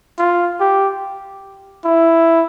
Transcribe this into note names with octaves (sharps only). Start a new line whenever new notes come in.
F4
G4
E4